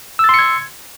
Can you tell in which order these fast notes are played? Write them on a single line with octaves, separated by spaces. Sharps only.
E6 A6 C6 C#7 G#6